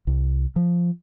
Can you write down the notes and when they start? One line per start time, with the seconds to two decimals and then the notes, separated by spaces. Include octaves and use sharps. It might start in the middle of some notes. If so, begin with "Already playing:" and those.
0.07 C2
0.56 F3